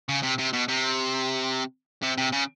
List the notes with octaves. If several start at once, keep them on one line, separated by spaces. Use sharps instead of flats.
C#3
C3
C3
B2
C3
C3
C3
C#3